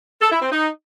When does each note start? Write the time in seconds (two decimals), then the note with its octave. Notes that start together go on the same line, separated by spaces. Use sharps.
0.22 A4
0.32 E4
0.42 C4
0.52 D#4